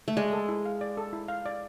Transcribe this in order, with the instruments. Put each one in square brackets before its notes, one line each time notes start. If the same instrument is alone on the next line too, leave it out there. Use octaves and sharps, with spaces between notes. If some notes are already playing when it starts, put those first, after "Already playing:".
[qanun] A3
[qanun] G#3 [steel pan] D5
[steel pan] A4
E4
F5
D5
A4
E4
F5
D5